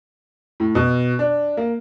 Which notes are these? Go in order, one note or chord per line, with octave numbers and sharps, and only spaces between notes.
A2
B2
D4
A#3